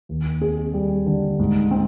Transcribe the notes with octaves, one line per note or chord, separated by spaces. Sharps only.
D#2
C4 G#4
G3
D3
G#2
C4